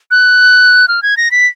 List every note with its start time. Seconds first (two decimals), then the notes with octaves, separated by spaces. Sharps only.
0.11 F#6
0.88 F6
1.03 G#6
1.17 A#6
1.31 B6